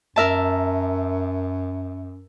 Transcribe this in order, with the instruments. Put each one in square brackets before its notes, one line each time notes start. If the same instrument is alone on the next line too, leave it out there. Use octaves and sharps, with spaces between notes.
[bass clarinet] F#2 [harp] A#4 E5 A5